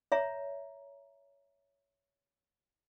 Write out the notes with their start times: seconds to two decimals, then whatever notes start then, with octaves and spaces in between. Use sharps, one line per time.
0.12 C#5 E5 A#5